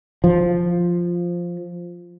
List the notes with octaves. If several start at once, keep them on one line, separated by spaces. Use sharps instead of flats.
F3